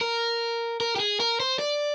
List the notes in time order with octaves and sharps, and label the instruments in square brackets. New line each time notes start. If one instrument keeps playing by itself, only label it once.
[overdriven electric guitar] A#4
A#4
G4
G#4
A#4
C5
D5